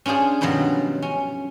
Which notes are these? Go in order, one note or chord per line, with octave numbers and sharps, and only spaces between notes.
C#4 D4 F4 G#4 C5
G2 B2 D#3 F3 F#3
C#4